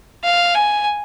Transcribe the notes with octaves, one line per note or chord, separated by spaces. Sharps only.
F5
G#5